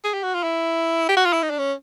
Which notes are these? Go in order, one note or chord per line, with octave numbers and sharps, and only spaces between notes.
G#4
G4
F#4
F4
E4
G4
F#4
F4
E4
D#4
D4
C#4